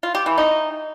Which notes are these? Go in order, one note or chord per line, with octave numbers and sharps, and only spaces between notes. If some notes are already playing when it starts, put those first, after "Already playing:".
F4
G4
E3
D#4